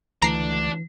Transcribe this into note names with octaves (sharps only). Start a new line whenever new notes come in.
C#2 D3 E3 A3 D4 A#5 C7